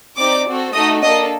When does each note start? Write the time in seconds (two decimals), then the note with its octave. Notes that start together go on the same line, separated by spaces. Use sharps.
0.17 C4 D#4 G4 D5 D6
0.46 C4 F#4 A4
0.73 A3 D#4 F#4 A4 D#5 D#6
1.02 A#3 D4 A4 D#5 D#6